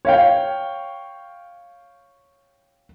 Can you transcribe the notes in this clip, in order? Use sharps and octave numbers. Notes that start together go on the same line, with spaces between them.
C#5 F5 G5